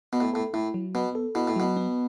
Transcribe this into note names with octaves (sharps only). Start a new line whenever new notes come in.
B2 B3
A2
A2 A4
A2 E4
F#3
B2 B3
A4
B2 E4
A2
B2 F#3
B3